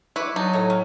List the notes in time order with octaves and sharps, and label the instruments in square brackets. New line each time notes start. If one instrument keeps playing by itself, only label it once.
[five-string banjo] E4 [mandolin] B4 C#5 D6
[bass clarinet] F#3 [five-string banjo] D#4 [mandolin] A5
[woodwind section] A2 [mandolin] C#5 D#5
[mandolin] C#4